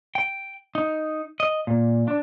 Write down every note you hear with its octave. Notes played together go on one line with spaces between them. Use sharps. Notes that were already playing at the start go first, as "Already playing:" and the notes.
G5
D#4
D#5
A#2
D4